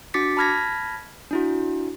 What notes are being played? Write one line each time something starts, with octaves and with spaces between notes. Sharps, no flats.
D4 F#4 D6 A6 B6 C#7
A5 B5 F6 G#6 A#6 B6
D4 E4 F#4